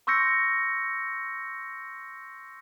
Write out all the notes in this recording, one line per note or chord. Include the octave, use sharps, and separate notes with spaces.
C6 C#6 E6 G6 A#6 C#7